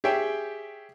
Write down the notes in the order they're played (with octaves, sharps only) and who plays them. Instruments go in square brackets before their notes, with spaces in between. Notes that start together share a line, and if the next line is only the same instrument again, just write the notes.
[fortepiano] G4 G#4 C#5 E5 G5